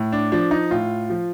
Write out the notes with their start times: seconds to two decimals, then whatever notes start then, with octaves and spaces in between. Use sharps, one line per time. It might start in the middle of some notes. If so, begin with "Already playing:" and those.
Already playing: A2
0.12 D4
0.32 F3 D4
0.51 D#4
0.71 A2 F4
1.10 F3